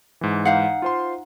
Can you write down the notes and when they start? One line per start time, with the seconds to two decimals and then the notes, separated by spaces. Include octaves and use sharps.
0.21 G#2 E3
0.45 D#4 F5 F#5
0.82 F4 C5 C6